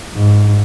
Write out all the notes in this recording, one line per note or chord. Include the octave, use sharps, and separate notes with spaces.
G#2